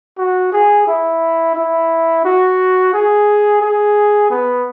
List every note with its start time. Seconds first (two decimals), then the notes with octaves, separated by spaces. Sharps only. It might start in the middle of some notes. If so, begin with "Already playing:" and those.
0.18 F#4
0.53 G#4
0.88 E4
1.55 E4
2.25 F#4
2.94 G#4
3.61 G#4
4.31 B3